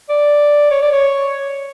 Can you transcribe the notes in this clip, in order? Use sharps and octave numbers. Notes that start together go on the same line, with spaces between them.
D5
C#5
D5
C#5